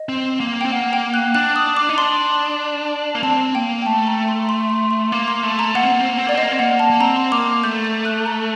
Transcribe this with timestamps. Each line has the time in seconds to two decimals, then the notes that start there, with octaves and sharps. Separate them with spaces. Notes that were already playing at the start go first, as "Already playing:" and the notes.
Already playing: D#5
0.09 C4
0.40 A#3
0.61 C4 G5
0.71 A#3 F#5
0.93 G5
1.14 F#6
1.35 D4 F#6
1.56 D#6
1.77 D6
1.89 D#4
1.97 D4 C6
3.15 A#3
3.23 C4 A5
3.55 A#3 G5
3.82 G5
3.86 A3 A5
4.07 A#5
4.28 C6
4.43 A#5
4.49 C6
4.70 C6
4.91 C6
5.12 A#3 D6
5.28 C6
5.43 A3
5.59 A#5
5.75 A#3 F#5
5.83 C4
5.92 A#3
6.00 C4
6.09 A#3
6.17 C4
6.27 A#3 D5
6.34 C4 D#5
6.43 A#3
6.52 C4
6.59 A#3 F#5
6.79 A5
6.90 A#3 A5
7.00 C4 A#5
7.16 C6
7.32 A#3 D6
7.63 A3 G6
7.85 G6
8.05 F#6
8.26 A#5